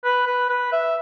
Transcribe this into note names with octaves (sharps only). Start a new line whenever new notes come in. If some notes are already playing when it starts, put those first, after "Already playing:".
B4
B4
B4
E5